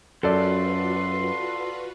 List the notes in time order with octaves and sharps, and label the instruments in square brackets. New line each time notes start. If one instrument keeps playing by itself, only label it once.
[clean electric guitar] F#2 [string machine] F4 F#4 B4 [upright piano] A4 D5 [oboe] C6